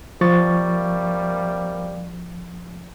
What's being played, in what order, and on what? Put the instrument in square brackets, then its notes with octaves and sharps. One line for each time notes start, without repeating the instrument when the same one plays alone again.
[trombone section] C3 G3 A#3 [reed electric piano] F3 C#6 A6